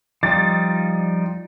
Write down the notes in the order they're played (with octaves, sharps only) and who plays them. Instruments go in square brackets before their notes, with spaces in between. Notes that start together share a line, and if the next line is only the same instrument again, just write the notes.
[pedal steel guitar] F3 G3 D#4 [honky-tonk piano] A6